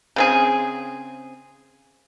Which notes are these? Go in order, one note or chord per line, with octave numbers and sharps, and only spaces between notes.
C#3 C4 G#4